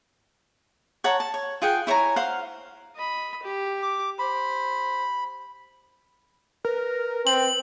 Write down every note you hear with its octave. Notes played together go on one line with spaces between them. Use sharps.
C#5 F#5 A5 A#5
A5
C#5
F4 G#4 F#5 G5
E4 C#5 G#5 A#5
C5 F5 F#5
D#5 B5
G4
D6
C5 B5
A#4 B4
C4 F#7